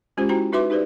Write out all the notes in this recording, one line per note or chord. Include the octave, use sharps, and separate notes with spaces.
G#3 C#4 F4 G4 C5
E4 F#4 C5 G5 A#5
D#4 F#4 B4 E5 C6 D6
D#4 G4 B4 C5 D5